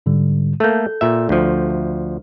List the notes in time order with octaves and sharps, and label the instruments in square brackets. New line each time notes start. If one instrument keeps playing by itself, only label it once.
[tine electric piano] G#2 D3 G3
[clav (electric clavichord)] A3 A#3 [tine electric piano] A4 G6
[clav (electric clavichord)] A#2 E5
D2 F3